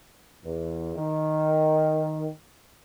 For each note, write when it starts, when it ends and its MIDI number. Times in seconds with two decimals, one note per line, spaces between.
0.44 0.96 40
0.96 2.28 51